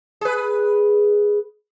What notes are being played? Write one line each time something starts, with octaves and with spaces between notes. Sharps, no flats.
G#4 B4